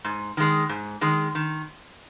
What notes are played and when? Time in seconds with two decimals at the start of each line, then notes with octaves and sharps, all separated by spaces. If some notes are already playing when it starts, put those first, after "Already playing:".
0.05 G#2
0.37 D#3 G#3
0.69 G#2
1.01 D#3 G#3
1.35 D#3